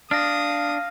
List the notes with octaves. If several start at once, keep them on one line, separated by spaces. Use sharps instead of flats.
D4 F5 D#6 F6 A#6